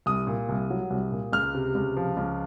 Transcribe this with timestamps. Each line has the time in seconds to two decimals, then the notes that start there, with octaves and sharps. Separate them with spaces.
0.06 C2 D#6
0.27 A#2
0.49 C2
0.70 F#3
0.90 C2
1.11 A#2
1.33 C#2 F6
1.54 C3
1.75 C#2
1.97 F3
2.17 C#2